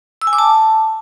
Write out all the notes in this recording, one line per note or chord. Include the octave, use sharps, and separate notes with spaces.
E6
G#5
D6
A5